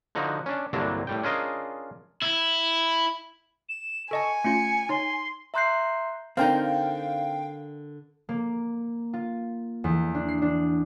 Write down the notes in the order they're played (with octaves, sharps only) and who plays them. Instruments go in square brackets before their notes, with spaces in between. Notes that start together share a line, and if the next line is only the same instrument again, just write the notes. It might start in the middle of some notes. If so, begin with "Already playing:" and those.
[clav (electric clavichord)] D3 F3 D#4 F#4
C#4 D4
C2 G2 D3 F#3 A#3 D4
A2 G3 G5
C#4 D4 F4 G#4 A#4 D#5
[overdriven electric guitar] E4
[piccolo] E7
[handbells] A4 D#5 A5 [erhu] G#5 [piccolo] C#6
[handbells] A3 C#4 F4 [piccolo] C#7
[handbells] D#4 C#5 [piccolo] C6
[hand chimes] E5 A#5 C6 F#6 G6 C7
[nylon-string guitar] D3 A#4 D5 [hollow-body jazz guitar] C4 D#4 [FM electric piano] F5 G5
[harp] A#3
F4
E2
D4
C7
D4